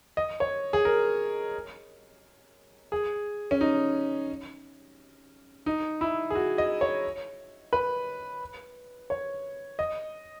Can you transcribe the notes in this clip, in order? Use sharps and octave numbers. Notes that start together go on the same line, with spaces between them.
D#5
C#5
G#4
A#4
G#4
C#4
D#4
D#4
E4
G#4
F#4
D#5
C#5
B4
C#5
D#5